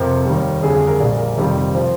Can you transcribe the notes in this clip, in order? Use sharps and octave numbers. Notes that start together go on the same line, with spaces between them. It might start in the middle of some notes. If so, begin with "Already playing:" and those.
Already playing: F2 C3 F3 A#4
D#2 D#3 G3
F2 D3 G3 G#4
G#4
A#4
A#1 A#2 G3 D5
A#4
F1 F2 D#3 G3
F3